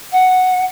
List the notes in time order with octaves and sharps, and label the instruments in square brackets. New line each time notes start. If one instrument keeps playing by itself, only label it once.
[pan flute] F#5